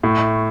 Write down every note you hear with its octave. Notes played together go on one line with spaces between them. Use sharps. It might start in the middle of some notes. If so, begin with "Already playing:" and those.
A2 A3